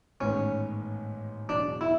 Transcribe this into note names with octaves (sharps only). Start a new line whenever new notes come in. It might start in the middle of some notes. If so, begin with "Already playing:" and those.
A1 G#2 D#3 G#3 B3 C#4
E1 E2 B2 F#3 D4
E4